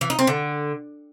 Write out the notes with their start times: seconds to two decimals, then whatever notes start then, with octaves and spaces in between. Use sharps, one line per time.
0.01 E3
0.10 D#4
0.19 C4
0.27 D3